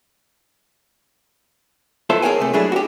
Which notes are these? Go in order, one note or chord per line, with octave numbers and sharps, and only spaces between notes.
B3 F4 A4 C5 E5 A5
G#4 A#4 C#5 F#5 G#5
C3 A3
F#3 A3 D4 E4 G#4
F#4 G4